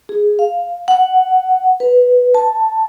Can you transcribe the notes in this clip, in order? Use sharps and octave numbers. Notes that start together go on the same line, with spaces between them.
G#4
F5
F#5
B4
A5